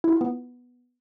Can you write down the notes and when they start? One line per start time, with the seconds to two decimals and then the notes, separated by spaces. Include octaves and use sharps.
0.04 E4
0.12 F4
0.21 B3